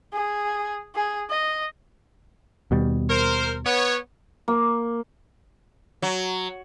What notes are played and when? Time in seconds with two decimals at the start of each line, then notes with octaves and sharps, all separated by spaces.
0.13 G#4
0.95 G#4
1.30 D#5
2.71 D#2 B2 G3
3.10 A#4 C5
3.66 B3 C#5
4.48 A#3
6.02 F#3